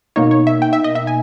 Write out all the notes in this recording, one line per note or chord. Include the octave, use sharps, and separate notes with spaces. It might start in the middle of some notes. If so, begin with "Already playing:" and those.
B2 A#3 D#4 C#5
C#5
E5
G5
E5
D#5
E5
G#5